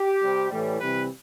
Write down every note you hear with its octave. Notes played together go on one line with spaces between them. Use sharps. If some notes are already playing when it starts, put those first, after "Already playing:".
Already playing: G4
C3 G3
A2 E3 G3
C3 E3 G3 B4